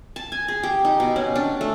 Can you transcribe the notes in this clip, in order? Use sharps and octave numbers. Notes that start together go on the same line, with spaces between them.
A5
G#5
G#4
G4
D#4
B2
C#4
D4
A3